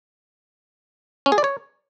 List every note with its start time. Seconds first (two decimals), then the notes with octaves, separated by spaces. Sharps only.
1.26 C#4
1.32 G#4
1.38 D5
1.44 C#5